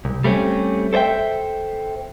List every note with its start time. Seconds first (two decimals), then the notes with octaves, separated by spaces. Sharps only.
0.05 C2
0.24 G3 A3 C4 C#4
0.93 A4 C5 D5 E5 G5